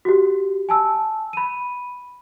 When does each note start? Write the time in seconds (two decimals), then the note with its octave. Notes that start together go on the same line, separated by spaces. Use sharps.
0.05 F#4 G4
0.69 G#5 A5 E6
1.33 B5 D#7